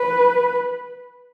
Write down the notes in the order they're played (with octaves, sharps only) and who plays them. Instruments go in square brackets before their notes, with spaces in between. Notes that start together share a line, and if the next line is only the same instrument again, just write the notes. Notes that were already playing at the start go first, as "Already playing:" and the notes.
Already playing: [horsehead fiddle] B4